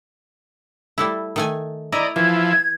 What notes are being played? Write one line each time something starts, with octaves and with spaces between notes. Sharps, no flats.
G3 A3 E4
D#3 A3 G#5
E4 D5 D#5 A#5
E3 F3 E4 G#6